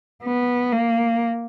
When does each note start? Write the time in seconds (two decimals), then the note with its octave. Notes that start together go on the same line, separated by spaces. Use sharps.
0.24 B3
0.72 A#3